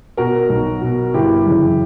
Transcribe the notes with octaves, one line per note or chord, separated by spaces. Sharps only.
B2 F#4 A#4
B1
B2
G1 E4 G4
F#2 C#3 E3